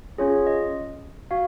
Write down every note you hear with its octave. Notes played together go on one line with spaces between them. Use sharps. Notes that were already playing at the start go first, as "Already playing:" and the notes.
C#4 F4 G#4 C#5
D#5
F#4 F5